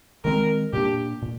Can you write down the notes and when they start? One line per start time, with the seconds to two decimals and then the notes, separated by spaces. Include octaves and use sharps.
0.24 D#3 G#3 C4 A#4
0.73 A#2 G3 A#3 D4 G4
1.22 A#2